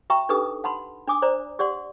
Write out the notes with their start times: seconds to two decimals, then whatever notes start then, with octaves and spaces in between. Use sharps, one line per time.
0.10 F#4 E5 G5 A#5 C#6
0.29 D4 D#4 G4 A4 B4 D#6
0.64 F#5 A5 B5 C6
1.07 D4 G#5 D6 D#6
1.22 C5 D5 A#5
1.59 G4 D5 F#5 C6